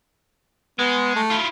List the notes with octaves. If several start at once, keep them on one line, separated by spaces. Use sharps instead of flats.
G#3 B3
A3
E4 F4